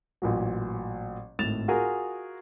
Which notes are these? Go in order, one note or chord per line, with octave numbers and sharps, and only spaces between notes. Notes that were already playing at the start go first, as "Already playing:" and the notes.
A1 A#2 F#3
G#1 A2 A6 E7 F7
F4 F#4 G#4 A#4 G#5 D#6